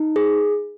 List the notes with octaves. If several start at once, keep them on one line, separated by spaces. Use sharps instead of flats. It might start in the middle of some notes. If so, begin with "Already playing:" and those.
Already playing: D#4
G#4